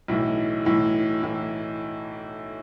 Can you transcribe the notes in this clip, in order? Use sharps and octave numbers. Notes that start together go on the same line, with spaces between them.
B1 A2 E3
B1 A2 E3
A2 E3